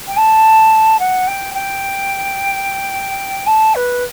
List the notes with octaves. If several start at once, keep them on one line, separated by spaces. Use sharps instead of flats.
G5
A5
F#5
G5
G5
A5
B4